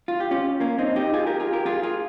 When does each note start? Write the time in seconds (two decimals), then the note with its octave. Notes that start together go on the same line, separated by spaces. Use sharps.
0.08 F4
0.20 G4
0.31 C#4 F4
0.60 A#3 C#4
0.78 C4 D#4
0.96 D#4 G4
1.13 F4 G#4
1.26 G4 A#4
1.40 F4 G#4
1.53 G4 A#4
1.66 F4 G#4
1.83 F4 G#4